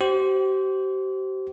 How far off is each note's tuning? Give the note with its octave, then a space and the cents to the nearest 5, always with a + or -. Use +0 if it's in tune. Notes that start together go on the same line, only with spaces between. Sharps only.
G4 -40 C5 +0